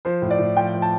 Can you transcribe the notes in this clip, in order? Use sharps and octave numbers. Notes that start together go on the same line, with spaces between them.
F3 C5
A2
D5
A2
F3 G5
F3
A5